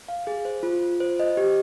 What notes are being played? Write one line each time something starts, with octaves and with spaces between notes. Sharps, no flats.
F5
G#4
C5
F4
F4
C5
D#5
G4